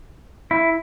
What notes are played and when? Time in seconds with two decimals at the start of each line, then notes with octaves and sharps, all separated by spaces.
0.51 E4